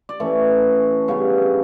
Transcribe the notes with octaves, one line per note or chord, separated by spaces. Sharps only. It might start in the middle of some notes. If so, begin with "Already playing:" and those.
D5
E3 A3 C#4 C#5
C#3 G3 B3 D4 C#5